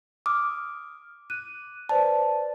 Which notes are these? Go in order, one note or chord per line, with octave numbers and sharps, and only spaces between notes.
D6 D#6 F6
F#6 D#7
B4 C5 D5 A5